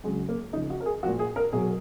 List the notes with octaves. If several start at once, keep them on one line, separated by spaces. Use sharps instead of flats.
C#3 F#3 G#3
A#3
C#3 F3 D#4
F#4
A#4
G#4
A#2 F3 F#4
G#4
A#4
B2 F#3 G#4